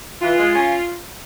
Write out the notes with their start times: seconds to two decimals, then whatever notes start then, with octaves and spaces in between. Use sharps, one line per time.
0.21 E3 F4
0.38 G#3
0.54 C#4